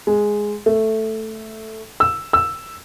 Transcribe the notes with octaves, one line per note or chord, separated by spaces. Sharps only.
G#3
A3
E6
E6